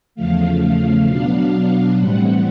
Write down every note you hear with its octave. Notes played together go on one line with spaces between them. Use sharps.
E2 C#3 F3 A3 F5
F5
B2 F#3 B3 D4
A2 E3 G3 C4 F#5